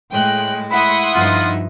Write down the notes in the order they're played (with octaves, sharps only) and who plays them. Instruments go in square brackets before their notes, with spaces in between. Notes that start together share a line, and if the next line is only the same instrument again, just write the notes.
[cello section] A2 G#3 [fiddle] G5 F#6
[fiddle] E4 [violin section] F#5 C6 D#6 [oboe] B5
[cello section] G2 F3 D#4 [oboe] F4